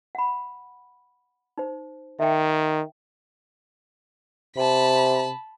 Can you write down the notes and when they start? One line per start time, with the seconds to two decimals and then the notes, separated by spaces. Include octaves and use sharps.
0.15 F#5 B5
1.58 D#4 C5
2.20 D#3 E5 G5
4.57 C3 A5 B5